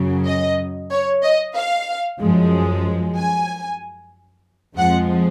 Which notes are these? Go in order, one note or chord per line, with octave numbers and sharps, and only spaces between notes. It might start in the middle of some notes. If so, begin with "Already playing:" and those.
Already playing: F#2 C#3 F#3
D#5
C#5
D#5
F5
F#2 F3 G#3
G#5
F2 F3 G#3 F#5